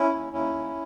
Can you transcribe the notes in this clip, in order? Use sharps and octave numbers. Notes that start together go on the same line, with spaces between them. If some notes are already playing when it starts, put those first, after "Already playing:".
Already playing: C#4 E4
D#2
D#2 C#4 E4
D#2